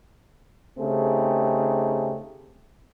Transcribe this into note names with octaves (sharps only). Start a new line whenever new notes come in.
C#3 A3 C4 D#4 G4 G#4